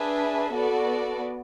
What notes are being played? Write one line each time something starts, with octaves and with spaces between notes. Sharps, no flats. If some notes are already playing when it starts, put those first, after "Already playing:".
Already playing: D4 G#4 B4 E5
B3 F#4 A4 D5